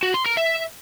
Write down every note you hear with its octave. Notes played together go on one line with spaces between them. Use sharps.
F#4
C6
A#4
E5